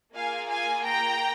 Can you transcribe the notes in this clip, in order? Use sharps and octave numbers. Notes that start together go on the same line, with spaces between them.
A#3 F4 G#4 F5 G#5
F5 G#5
G5 A#5